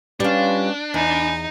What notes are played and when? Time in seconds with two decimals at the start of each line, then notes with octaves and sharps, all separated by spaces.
0.20 G3 C#4 D4 F4 B4
0.94 E2 D#4 G#5 B5